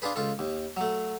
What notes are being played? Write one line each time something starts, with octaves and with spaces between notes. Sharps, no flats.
D4 F4 G#4 B4
C#2 F4 A4
D#2
F#3 A3